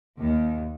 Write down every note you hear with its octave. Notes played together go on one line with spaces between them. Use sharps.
D#2